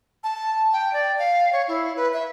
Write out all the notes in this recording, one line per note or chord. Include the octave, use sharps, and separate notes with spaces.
A5
G5
D5
F5
C#5
E4
B4
E5